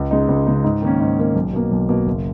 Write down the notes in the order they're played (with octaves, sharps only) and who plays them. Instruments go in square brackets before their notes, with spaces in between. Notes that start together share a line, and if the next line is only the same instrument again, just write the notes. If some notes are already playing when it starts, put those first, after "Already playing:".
Already playing: [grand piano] C#2
C#3 G#3 D#4
C#2
C#3 G#3 D#4
G#2
D#3 A#3 C#4
G#2
D#3 A#3 C#4
B1
B2 A#3
B1
B2 A#3
F#1